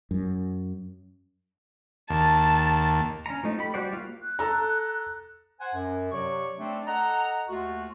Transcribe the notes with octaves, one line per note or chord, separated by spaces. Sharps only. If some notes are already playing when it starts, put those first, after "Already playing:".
F#2
D#2 A5
C#4 A#5
F3 A3 D#4 A4
G4 B5
G3 F#4 G4 C5 D5
A#3 F4
F#6
A4 A#5
C5 F#5 G#5
F#2
C3 F#3 C#5 D5 C#6
A3 C4 D4
A4 D#5 F#5 A#5
D#2 A3 F4 F#4